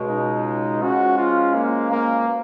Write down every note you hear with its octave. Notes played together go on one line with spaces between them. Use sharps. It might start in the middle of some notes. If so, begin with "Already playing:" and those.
Already playing: C#2 B2 G#3
D#4
C#3 F3 G#3 C#4 F#4
F4
A#3
A#3
B2